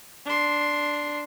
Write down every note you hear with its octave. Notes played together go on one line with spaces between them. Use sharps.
D4 C6